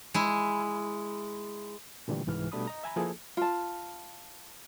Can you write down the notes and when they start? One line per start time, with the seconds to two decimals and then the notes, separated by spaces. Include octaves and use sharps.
0.14 G#3 E4
2.08 A#2 D3 E3 G3 A3
2.27 C2 G#2 E3 F6
2.52 B2 G3 A3 D4 B5 D#6
2.67 D#5 A#5
2.84 E5 G#5 A#5 B5
2.96 F3 A#3 E4 G#4 A4
3.37 F4 A5